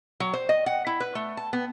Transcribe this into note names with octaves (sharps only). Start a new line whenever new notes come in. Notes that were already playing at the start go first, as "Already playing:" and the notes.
F#3
C5
D#5
F#5
E4
B4
A3
A5
B3